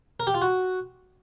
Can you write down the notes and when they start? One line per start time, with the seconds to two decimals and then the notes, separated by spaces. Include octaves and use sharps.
0.20 A#4
0.27 G4
0.34 F4
0.42 F#4